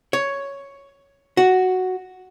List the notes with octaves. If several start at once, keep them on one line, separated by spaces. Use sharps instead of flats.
C#5
F#4